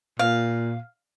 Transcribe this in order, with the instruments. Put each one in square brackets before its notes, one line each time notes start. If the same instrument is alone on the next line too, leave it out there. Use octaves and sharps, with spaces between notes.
[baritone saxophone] A#2 [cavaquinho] F5